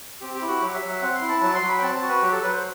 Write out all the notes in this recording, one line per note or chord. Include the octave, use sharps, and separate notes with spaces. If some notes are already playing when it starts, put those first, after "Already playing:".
C4 G4
G4
E4
F#4
F#3 G4
E5
F#3
E5
C4 F#5
C6
E4
A5
F#3 A5
C6
F#3
B5
G5
C4 A5
A5
F#4
B4
F#3 G4
A4
F#3 B4
C5